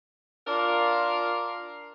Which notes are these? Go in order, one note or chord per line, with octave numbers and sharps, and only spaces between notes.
D4 F4 A#4 D5 F5